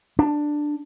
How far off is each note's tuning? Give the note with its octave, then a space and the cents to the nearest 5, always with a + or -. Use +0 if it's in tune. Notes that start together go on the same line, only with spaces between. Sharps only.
D4 +10